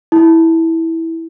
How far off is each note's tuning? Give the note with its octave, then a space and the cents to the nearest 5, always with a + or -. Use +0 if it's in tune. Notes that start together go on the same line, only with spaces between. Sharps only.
E4 -10